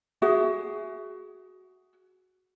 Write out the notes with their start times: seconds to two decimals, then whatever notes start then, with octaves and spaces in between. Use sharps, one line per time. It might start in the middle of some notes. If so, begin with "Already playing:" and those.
0.22 F#4 G#4 E5